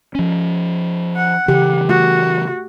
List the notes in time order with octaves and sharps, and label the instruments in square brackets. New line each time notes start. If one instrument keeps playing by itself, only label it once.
[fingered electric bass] F3 C#4
[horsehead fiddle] F#5
[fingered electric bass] C#3 E3 [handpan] G4
[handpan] A3 [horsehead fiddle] F#4